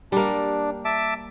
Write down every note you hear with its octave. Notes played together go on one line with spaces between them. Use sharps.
G3 A#3 D4
E5 A5 D6